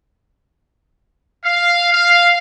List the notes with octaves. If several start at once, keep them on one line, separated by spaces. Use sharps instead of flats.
F5
F5